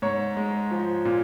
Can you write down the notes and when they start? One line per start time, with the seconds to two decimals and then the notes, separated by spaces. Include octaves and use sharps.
0.02 G#2 C#5
0.37 G#3
0.71 F3
1.05 A#2